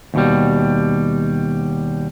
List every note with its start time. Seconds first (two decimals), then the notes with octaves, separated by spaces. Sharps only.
0.14 D#2 B2 G3